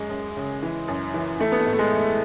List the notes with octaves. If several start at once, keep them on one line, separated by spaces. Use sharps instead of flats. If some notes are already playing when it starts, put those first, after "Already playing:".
Already playing: F#2 G#3
F#2
C#3
E3
F#2
E3
E3 A3
B3
A3
A2
A3
G#3
E3
A3